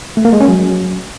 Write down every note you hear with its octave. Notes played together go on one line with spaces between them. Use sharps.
A3
A#3
G#3
C#4
F#3